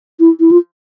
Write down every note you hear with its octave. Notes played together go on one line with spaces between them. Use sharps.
E4
E4
F4